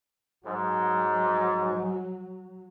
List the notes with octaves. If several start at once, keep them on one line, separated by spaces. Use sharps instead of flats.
G#2 F#3